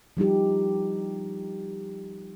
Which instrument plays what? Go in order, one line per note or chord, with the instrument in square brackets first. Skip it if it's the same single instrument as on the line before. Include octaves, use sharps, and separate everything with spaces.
[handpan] F3 G3 D#4 G4